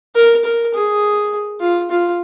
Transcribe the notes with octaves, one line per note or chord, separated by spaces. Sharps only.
A#4
A#4
G#4
F4
F4